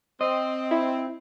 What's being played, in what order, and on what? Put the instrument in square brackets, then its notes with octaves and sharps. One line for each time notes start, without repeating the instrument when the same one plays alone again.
[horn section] C4 [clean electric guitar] D#5
[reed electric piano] E4